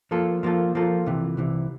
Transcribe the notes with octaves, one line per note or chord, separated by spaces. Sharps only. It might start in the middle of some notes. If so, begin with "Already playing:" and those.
F3 A#3 F4 A4
F3 A#3 F4 A4
F3 A#3 F4 A4
C2 C3 E3
C2 C3 E3